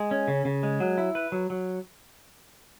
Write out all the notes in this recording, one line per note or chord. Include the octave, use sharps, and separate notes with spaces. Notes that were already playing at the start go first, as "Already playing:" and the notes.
Already playing: G#3
C#4
C#3
C#3
G#3
F#3
E4
B4
F#3
F#3